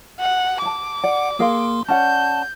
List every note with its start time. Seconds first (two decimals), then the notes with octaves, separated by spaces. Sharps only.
0.20 F#5
0.62 F#5 A5 D6
1.04 D5 F#5
1.39 A#3 G#4 A#4 F5 C6
1.89 C#4 D5 F#5 A5 G6